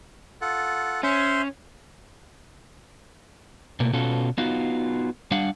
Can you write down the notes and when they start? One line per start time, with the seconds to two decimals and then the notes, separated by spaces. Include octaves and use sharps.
0.41 F4 A4 F#5
1.03 C#4 C5 E5 C6
3.80 B2 A3 A#3
3.93 B2 B3 C#4 F4 F#4 A4
4.38 B3 D#4 F4 F#4
5.31 G3 D4 F5 F#5